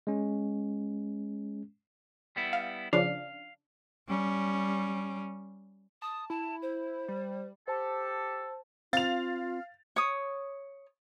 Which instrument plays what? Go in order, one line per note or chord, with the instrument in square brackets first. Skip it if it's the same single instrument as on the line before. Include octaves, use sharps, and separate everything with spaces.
[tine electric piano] G#3 C#4
[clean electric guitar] G3 B3 E4
[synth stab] F5
[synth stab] C#3 F3 D4 [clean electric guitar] F5
[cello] G3 C#4
[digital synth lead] A5 [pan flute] D#6
[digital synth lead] E4 [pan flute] A5
[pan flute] C5
[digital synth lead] G3
[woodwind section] G4 A4 [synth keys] C5 A5
[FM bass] C4 [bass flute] F4 [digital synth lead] F5 [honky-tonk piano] A6 F7
[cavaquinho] C#5 D#6